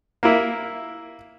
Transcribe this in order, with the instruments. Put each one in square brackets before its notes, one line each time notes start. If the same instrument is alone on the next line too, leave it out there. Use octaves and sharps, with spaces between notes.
[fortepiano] A#3 E4